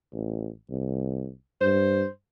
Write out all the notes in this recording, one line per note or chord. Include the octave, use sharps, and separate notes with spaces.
A1
C2
G2 C5